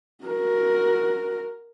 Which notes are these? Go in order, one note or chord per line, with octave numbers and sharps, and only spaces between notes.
F#4 A#4